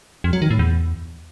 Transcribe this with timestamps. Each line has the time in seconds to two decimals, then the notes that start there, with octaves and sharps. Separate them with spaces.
0.24 F2
0.33 F#3
0.42 D#3
0.50 A2
0.59 E2